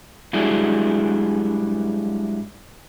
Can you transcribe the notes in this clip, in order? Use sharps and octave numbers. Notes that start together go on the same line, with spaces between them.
G#2 F#3 G3 D4 E4 G#4